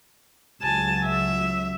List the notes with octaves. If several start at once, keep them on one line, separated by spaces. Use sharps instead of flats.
C#2 F#3 G#5 A5
E5